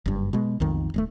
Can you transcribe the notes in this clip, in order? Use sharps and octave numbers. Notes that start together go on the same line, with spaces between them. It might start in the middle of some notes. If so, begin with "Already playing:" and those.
F#1 G2
B2 G#3
B1 F2 D#3
D1 G#3 A3